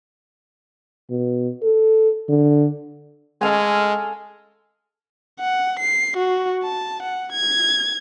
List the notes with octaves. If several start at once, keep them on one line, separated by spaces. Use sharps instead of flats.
B2
A4
D3
G#3 A4 F5 G#5
F#5
C7
F#4
A5
F#5
G#6